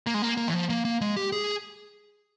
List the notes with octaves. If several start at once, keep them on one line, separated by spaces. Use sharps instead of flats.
A#3
G#3
A#3
A#3
E3
F3
A#3
A#3
G#3
G4
G#4